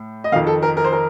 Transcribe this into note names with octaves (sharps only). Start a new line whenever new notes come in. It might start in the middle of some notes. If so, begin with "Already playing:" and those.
Already playing: A2
D#5
F2 D#3 F5
A4
A#4
A#4
C5
A#4